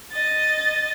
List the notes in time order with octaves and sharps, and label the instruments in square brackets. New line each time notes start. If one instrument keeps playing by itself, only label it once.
[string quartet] D#5 A6